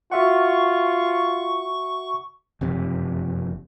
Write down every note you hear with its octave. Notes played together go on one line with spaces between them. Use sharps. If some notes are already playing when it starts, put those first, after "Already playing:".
F4 F#4 E5 F#5 C#6
F#1 F2 C3